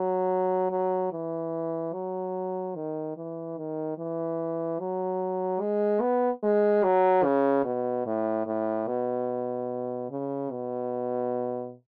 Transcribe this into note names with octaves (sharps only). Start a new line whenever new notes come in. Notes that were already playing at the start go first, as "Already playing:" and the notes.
Already playing: F#3
F#3
E3
F#3
D#3
E3
D#3
E3
F#3
G#3
B3
G#3
F#3
C#3
B2
A2
A2
B2
C#3
B2